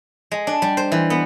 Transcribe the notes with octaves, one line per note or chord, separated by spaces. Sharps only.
G#3
D4
G3
C5
E3
B3